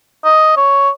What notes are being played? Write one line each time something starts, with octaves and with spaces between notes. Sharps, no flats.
D#5
C#5